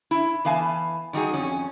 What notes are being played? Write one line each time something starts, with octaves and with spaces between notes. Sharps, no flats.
E4
E3 B3 F5 G#5 A5
D#3 G3 D#4 F#4 G#4
F2 C#4